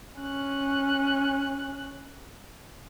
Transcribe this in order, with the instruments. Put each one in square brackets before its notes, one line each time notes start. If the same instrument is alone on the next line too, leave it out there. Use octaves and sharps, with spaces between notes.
[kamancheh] C#4 F#6